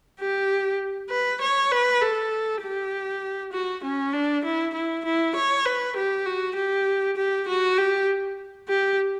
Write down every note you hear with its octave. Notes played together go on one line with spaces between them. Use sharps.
G4
B4
C#5
B4
A4
G4
F#4
C#4
D4
E4
E4
E4
C#5
B4
G4
F#4
G4
G4
F#4
G4
G4